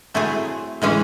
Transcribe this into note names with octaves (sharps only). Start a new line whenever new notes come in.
F#3 A3 C4 E4 G#4
A2 E3 G#3 C#4 G#4